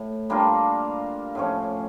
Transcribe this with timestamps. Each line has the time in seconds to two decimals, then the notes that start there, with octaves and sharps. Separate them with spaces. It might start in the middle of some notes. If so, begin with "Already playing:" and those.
Already playing: A2
0.30 G3 A#3 D4 F4
1.35 A2 F3 C#4